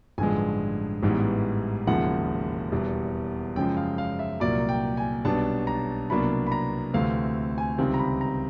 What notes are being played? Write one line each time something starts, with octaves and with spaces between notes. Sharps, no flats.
A1 G2 D3 F3 G#3 G#5
A1 G#2 E3 G3 B3
E1 D#2 C#3 F3 G#3 F#5
E1 E2 B2 G3
F#2 C#3 F3 G#3 G5
F5
F5
E5
C2 A#2 F#3 A#3 D5
G5
G#5
B1 B2 G3 B3 D4 A5
A#5
C2 B2 F#3 A#3 D4 B5
B5
A#5
D2 C3 E3 A3 C4 F5
G#5
C#2 C3 D#3 G3 C4
A#5
B5
A#5